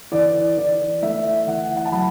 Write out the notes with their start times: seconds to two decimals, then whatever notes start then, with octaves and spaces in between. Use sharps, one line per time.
0.12 E3 D5
0.57 E3 D5
1.02 A3 E5
1.47 E3 F#5
1.76 F#5
1.85 A5
1.92 F#3 B5